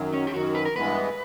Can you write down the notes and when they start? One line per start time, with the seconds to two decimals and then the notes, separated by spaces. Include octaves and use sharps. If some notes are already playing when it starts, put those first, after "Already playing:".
Already playing: F#2 D#3 F#3
0.14 C#4
0.27 G4
0.34 F#2 D#3 F#3 F#4
0.55 B4
0.65 A#4
0.76 G2 E3 G#3 B3 B4